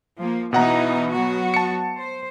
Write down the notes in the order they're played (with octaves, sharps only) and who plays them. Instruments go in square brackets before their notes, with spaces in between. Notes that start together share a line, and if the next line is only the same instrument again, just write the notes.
[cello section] F3 A#3
[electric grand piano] B2 F#5 A#5 [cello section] E3 B3 D#4
[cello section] F#3 B3 F#4
[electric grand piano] A5 C#7
[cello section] C5